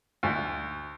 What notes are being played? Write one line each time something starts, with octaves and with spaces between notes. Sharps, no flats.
D2